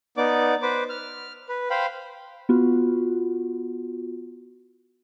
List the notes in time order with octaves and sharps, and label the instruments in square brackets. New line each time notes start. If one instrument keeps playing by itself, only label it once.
[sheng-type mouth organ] B3 D#4 D5 D6
B4 C5 D6
F6
B4
C5 F5 G5 B5
[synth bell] B3 F4 F#4